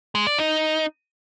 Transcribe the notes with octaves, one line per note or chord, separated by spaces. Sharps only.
G#3
D5
D#4